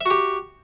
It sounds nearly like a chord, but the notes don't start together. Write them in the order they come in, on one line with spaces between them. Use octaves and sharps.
E5 F#4 G4